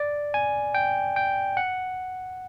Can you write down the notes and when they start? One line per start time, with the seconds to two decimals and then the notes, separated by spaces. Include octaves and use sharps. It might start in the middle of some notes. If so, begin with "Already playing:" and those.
Already playing: D5
0.34 G#5
0.74 G5
1.16 G5
1.57 F#5